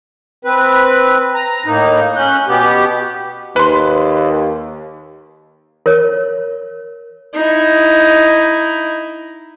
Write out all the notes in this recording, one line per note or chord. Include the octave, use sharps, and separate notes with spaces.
C4 B4
A#5
A2 A#3 D#4
C#4 F#6 G6
B2 B3 G4
D#2 B4 C6
A#4 C#5
D#4 E4